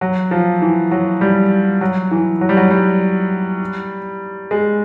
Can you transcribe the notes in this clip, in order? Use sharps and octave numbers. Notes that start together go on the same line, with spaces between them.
F#3
F3
E3
F#3
G3
F#3
E3
F#3
G3
F#3
G3
G#3